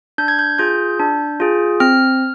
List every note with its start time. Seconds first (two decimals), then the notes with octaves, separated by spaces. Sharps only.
0.18 D4 G6
0.28 G#6
0.39 G6
0.59 F4 G#4 G6
0.99 D4
1.40 F4 G#4
1.80 C4 F6